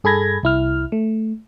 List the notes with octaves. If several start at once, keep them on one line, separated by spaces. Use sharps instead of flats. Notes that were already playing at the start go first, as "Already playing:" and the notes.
G2 G#4 A4 B5 G#6 A#6
C2 E4 F6
A3